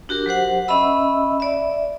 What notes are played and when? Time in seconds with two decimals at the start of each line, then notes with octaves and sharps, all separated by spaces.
0.09 D4 F#4 G4 A#4
0.26 F#3 G4 C5 F#5
0.68 C#4 D#5 E5 B5 E6
1.40 D5 E5